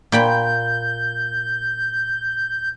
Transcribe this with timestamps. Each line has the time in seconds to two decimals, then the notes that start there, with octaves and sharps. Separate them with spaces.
0.12 A#2 G5 B5 G6